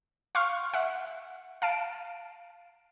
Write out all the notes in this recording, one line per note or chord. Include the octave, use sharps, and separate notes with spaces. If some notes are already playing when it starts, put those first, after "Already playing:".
F5 C6 C#6 F6
E5 F#5
F5 A5 D7